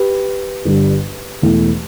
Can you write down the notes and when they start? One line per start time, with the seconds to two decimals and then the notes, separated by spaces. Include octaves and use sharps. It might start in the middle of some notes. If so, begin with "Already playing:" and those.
Already playing: G4 B4
0.65 G1 G2 G3
1.42 E1 E2 E3 A3